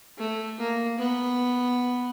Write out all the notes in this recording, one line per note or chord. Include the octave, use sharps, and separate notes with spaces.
A3
A#3
B3